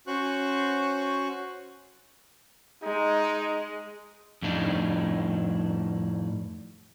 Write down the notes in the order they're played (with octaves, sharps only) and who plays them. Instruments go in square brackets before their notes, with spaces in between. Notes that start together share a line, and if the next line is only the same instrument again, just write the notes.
[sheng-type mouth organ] C#4 F#4 C5 C#6 F#6
[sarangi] G#3 [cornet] D#4
[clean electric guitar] F2 A2 D4 D#4